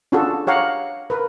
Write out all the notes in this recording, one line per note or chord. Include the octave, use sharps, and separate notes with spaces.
C#4 D4 F4 F#4 G#4 A4
G4 C#5 F5 F#5 A#5
A#4 B4